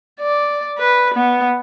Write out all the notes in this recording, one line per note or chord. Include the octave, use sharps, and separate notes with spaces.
D5
B4
B3